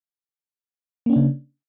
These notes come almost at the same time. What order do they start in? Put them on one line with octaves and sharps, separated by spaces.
A#3 C#4 D4 C#3